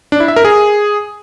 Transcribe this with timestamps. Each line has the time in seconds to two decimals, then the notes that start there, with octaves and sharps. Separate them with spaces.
0.12 D4
0.20 E4
0.28 E5
0.36 A#4
0.45 G#4